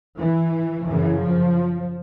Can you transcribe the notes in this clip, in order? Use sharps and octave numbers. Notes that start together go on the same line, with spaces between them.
E3
F#2 C#3 E3
F3